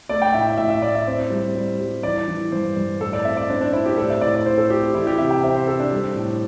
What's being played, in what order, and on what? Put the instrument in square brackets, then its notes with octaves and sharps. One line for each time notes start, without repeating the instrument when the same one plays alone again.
[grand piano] A3 D5
G5
A2 E5
E5
A2 E5
E5
A2 D5
E5
C4
G3
G3
G3
E3 D5
E3
G2 C5
G2
A2 A4
D5
C4 E5
D5
C4 D4
D4
C4 E4
G4
A2 A4
E5
A2 D5
D5
A2 C5
A4
C4 G4
E3 E4
G4
C3 E5
G5
C4 E5
C5
C4 A4
D4
G3
A2